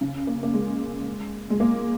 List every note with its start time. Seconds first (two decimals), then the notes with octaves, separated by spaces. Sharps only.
0.01 C#3
0.27 A#3
0.43 A#3
0.54 G#3
1.50 G#3
1.60 A#3